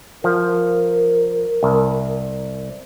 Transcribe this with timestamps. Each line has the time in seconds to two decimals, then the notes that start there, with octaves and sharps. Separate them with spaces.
0.24 F3 A#4
1.63 C2